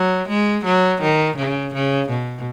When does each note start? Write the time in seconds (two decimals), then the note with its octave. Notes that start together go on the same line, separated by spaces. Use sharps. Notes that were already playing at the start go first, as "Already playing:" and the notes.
Already playing: F#3
0.28 G#3
0.65 F#3
1.02 D#3
1.37 C#3
1.74 C#3
2.09 B2